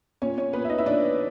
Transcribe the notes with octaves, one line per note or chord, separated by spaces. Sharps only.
A#2 C#4 C#5
C#4 C#5
A#2 B3 B4
E5
D#4 D#5
E4 E5
A#2 D4 D5